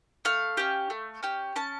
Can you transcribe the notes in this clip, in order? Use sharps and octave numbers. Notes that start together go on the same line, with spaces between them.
A3 F5
C#4 G4
A3
C#4 G4
C#4 A5